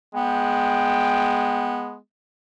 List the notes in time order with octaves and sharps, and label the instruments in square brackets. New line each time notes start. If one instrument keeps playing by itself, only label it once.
[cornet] G#3 [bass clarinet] B3 [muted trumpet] G5